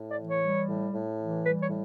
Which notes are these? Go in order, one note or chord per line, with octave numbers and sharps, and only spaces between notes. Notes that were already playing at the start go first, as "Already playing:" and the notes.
Already playing: A2
D5
E3
C#5
G3
A2
A2
E3
G3 B4
C#5
A2